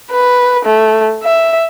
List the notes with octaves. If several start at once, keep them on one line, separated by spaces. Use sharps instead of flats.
B4
A3
E5